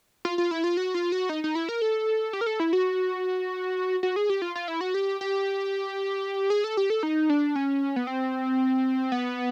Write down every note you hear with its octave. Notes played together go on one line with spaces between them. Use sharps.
F4
F4
E4
F4
F#4
F4
F#4
D#4
D#4
E4
A#4
A4
G4
A#4
A4
E4
F#4
F#4
G#4
G4
F4
F4
E4
F#4
G4
G4
G#4
A4
G4
A4
D#4
D4
C#4
B3
C4
B3